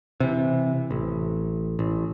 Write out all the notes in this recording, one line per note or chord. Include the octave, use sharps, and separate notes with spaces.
C3 E3
A1
A1